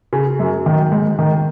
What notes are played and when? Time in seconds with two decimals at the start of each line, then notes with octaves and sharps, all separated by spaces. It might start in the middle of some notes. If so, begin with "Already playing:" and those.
0.13 C#3
0.39 F#2
0.66 D#3
0.92 G#2
1.19 D#3